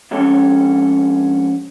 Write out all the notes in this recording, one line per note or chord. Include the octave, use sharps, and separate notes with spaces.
F2 G#2 C#4 G4 A4